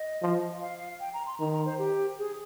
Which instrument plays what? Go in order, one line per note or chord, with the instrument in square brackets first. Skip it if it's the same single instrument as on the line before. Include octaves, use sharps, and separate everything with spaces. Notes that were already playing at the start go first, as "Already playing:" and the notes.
Already playing: [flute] D#5
[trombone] F3
[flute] F5
G5
A#5
C6
[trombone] D#3 [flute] A#5
[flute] A#5
C5
G4
G#4